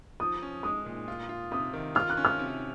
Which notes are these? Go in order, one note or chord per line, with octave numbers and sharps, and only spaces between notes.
F3 D#6
C#4
G#3 D#6
A#2
F4
F4
C3 D#6
D#3
F4 F6
F#6
C#4
F6
C3